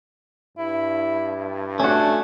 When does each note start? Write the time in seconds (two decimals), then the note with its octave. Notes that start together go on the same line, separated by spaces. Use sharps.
0.58 G2 E4
1.80 A3 C#4 D4 F#4